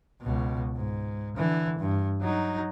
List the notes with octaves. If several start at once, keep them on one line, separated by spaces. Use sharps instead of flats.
C#2 B2
G#2
D3 E3
G2
F#3 D#4